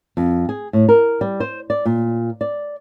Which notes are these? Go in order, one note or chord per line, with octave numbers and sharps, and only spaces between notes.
F2
G#4
A2
A#4
G3
C5
D5
A#2
D5